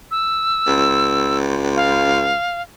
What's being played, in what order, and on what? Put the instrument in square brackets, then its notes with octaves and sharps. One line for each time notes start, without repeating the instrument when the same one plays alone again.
[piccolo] E6
[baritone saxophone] C#2
[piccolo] F5